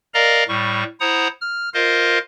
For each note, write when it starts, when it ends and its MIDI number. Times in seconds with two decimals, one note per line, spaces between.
0.14 0.44 70
0.14 0.44 74
0.14 0.44 75
0.14 0.44 77
0.14 0.44 82
0.48 0.84 45
0.48 0.84 55
0.48 0.84 85
1.00 1.28 64
1.00 1.28 72
1.00 1.28 78
1.00 1.28 82
1.00 1.28 87
1.41 1.69 89
1.74 2.18 65
1.74 2.18 70
1.74 2.18 72
1.74 2.18 75
1.74 2.18 77